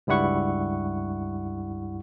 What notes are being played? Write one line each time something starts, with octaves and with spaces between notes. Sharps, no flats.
C#2 G2 G3 E4 F#5 C#6